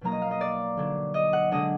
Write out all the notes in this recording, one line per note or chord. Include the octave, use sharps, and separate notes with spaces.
B2 F#3 A#3 D#4 A#5
D#5
F5
D#5
D5
D3 F#3 D4
D#5
F#5
D3 G#3 D4 D#5